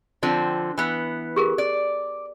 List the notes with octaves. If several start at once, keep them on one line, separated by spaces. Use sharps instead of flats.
D3 F3 C4
E3 B3
G4 G#4 A#4
D5